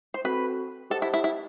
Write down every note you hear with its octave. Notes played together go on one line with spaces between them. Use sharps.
C5
C4 F#4 A4 B4
G4 A4 C5 D#5 F#5 A5
E4
E4
E4